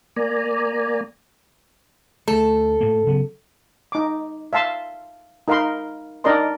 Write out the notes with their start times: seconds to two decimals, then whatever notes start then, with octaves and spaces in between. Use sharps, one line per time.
0.16 A#3 D5 G#5 A#5
2.28 D2 A3 A4
2.81 A2 A#3
3.06 C#3 F#3 B3
3.92 D#4 D6
4.53 E5 F5 A5 C6
5.48 D#4 A#4 F5 B5 C6
6.24 D4 D#4 A#4 D5 D#5 C6